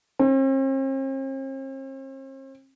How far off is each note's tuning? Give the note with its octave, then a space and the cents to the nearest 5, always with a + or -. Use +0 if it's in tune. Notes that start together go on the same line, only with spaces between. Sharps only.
C4 +45